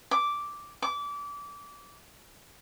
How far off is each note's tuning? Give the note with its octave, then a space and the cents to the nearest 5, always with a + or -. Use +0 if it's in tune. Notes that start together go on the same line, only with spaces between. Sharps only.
D6 -5
D6 -25